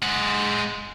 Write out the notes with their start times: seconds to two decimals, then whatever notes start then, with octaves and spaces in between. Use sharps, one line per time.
0.03 G#3 F#5